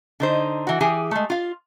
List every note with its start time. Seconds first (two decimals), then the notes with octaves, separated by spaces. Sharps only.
0.20 D3 D#4 C5
0.67 E3 F#4
0.81 E3 G4 G#4 G#5
1.11 G#3 A3
1.30 F4 F5